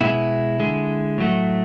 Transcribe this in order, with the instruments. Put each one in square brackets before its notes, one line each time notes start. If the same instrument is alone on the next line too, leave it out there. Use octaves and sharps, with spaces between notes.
[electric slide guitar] B2 G#3 E4
D3 G#3
A2 F#3 A3